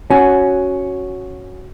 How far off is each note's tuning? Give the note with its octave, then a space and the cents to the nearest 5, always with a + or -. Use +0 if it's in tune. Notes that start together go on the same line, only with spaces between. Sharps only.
C#4 +0 F#4 +0 G#5 +20